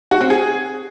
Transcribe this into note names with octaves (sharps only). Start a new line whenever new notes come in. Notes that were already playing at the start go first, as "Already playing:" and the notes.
F#4
C4
G#4